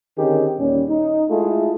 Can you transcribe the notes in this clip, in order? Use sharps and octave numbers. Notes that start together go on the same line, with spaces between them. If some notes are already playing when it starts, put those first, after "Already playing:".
D3 D#3 C4 C#4 G4 G#4
D#2 A#2 G3 C#4
D#4
G#3 A3 E4 F4 G#4 A4